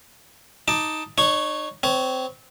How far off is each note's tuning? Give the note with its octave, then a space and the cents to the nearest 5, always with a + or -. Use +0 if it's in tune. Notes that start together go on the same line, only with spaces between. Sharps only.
D#4 +10 A5 +5 D6 +20
D#4 -40 C#5 +0 C#6 +0
C4 -20 C#5 +5